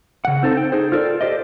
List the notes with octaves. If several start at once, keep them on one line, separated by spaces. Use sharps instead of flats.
C#3 F#5
C4 D#4 A4 C5 A5
G5
D#4 G#4 C5
F4 A4 A#4 D5
G4 C5 D5 D#5